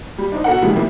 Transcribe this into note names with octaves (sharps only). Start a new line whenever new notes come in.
G3
D4 D#4 C5
B2 A4 A#4 F#5
C3 D#3 F3 G3 G#3 A#3
F3 G3 A#3 C4 E4